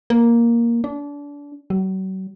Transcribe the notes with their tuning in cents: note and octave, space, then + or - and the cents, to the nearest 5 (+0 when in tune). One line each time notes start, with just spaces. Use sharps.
A#3 +5
D4 -30
F#3 +40